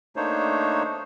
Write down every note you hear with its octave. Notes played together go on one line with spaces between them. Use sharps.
A3 A#3 D4 D#4 C5 C#5